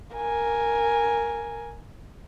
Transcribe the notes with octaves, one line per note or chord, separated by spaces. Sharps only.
A#4 G#5